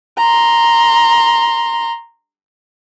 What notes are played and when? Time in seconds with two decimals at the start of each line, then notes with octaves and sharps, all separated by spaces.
0.17 A#5 C6